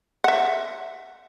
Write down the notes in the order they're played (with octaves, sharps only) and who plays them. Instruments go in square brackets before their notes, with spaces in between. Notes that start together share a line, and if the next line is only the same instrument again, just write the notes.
[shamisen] E5 F#5